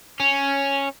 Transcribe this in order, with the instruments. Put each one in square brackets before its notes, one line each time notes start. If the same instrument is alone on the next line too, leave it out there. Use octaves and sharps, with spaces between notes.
[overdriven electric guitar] C#4